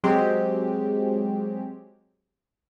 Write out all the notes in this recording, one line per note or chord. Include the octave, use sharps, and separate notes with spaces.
F#3 G#3 C4 G4